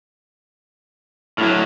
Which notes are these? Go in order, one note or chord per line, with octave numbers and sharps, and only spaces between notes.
A2 F#3 E4 F6